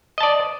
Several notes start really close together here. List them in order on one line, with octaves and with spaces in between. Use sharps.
D#5 A5 D5